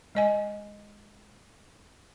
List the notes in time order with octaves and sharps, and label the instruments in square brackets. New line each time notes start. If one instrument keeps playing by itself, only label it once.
[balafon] G#3 D#5 G#5